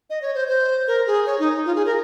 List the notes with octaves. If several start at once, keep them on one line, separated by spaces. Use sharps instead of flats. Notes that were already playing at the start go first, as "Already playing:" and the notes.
D#5
C#5
C5
C5
A#4
G#4
C#5
D#4
F4
G#4
A#4